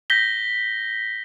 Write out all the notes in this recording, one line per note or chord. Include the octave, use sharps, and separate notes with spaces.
G6 A#6 B6 G7